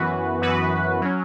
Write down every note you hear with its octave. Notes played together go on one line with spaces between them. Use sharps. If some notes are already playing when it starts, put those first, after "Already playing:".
Already playing: F#2 E3 B3 F#4 B4
F#2 E3 B3 F#4 B4
F#3 C#4